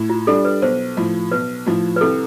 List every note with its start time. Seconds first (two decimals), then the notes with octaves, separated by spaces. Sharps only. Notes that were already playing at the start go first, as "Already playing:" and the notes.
Already playing: A2
0.10 F4
0.27 G3 D4 A4
0.45 B4
0.62 B1 C5
0.97 A2 F3
1.32 B1 B4
1.66 A2 F3
1.96 B4
2.01 C2 A4